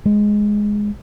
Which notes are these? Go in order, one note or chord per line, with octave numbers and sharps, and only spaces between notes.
G#3